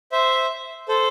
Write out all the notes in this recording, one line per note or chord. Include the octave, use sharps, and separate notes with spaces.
C5 E5
A4 C5